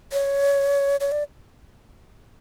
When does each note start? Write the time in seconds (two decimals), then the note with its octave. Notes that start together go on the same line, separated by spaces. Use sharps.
0.12 C#5
1.00 C#5
1.12 D5